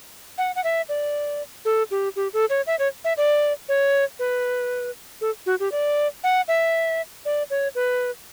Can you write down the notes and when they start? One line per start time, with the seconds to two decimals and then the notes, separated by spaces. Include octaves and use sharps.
0.38 F#5
0.56 F#5
0.64 E5
0.89 D5
1.65 A4
1.91 G4
2.16 G4
2.33 A4
2.50 C#5
2.67 E5
2.79 C#5
3.04 E5
3.17 D5
3.69 C#5
4.19 B4
5.21 A4
5.46 F#4
5.60 G4
5.72 D5
6.24 F#5
6.48 E5
7.25 D5
7.50 C#5
7.75 B4